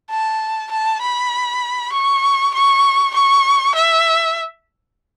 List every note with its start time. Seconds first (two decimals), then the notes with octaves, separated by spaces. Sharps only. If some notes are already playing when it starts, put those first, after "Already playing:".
0.10 A5
0.71 A5
1.01 B5
1.93 C#6
2.54 C#6
3.14 C#6
3.75 E5